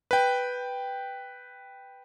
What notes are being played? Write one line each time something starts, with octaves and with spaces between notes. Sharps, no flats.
B4 G5